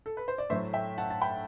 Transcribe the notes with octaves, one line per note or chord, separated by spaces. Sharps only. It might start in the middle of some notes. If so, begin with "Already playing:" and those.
A4
B4
C5
D5
A2 F#3 A3 C5 E5
E5 G5
F#5 A5
A5
G5 B5